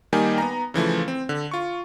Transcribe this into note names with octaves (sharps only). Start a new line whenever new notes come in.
D#3 G3 A#3 D#4 G#5
B3 A#5
C#3 E3 F3 A3
C4
D3
F4 C#6